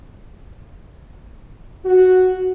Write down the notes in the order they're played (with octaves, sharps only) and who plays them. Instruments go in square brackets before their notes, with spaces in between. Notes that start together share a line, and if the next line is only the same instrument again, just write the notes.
[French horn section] F#4